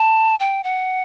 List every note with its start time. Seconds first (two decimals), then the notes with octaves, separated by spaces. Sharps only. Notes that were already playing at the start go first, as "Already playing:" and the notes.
Already playing: A5
0.40 G5
0.64 F#5